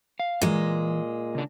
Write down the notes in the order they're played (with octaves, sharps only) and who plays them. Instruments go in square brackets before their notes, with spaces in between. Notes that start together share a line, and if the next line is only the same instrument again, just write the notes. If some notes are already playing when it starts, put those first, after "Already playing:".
[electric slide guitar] F5
[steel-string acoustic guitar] A#2 G#3 [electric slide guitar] E3
[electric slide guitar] C#3 D4